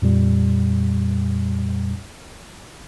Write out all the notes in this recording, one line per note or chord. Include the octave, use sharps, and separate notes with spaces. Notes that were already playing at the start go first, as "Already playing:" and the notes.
F2 A#2 G3